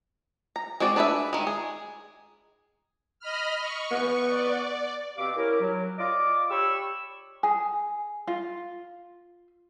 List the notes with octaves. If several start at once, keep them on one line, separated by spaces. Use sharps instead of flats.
A#5
G#3 C4 F#4 D5
D4 G#4 B4 C5 E5
D#3 G#3
G#4
D#5 B5 F6
C#6
B3
D5
B2 C4 G4 F5 D6
C#4 E4 G4 A#4
F#3
F4 D5 D#5 D6
G4 C#5 B5 C#6 E6
G#4
F4